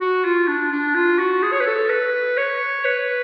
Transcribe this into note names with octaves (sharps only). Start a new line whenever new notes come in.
F#4
F4
D4
D4
F4
F#4
G#4
C#5
B4
A4
B4
C#5
B4